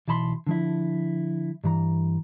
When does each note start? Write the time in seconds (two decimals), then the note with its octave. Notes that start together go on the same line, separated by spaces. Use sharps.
0.08 B1 E3 A5 B5 C6
0.47 D3 F3 E4
1.64 G2 E3 A#5